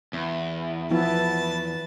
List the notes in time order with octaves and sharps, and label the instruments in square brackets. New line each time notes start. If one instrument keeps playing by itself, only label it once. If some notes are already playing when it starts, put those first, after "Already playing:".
[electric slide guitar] E2
[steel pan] F3 B3 E4 [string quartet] B4 A5 A6